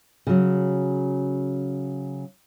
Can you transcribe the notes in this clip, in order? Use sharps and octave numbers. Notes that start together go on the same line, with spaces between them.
C#3 F#3